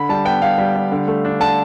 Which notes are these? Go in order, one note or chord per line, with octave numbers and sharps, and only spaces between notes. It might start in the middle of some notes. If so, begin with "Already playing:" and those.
Already playing: D3 B5
G3 A5
B3 G5
G3 F5
G3
G3
D3
A3
D4
D3 A5